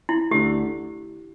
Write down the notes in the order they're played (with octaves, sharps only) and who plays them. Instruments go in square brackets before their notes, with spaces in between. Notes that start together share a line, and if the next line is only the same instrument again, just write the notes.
[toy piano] E4
[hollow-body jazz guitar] D2 D3 A3 [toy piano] G4